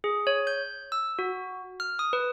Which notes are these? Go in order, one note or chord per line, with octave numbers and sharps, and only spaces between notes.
G#4
C#5
G6
E6
F#4
F6
D#6
B4